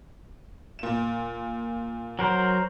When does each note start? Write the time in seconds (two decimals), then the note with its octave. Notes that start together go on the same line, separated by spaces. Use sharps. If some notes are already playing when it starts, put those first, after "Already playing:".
0.79 A#2 E7
2.19 F#3 A#4 C5